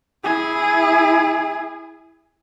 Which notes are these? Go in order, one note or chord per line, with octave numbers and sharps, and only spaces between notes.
E4 G#4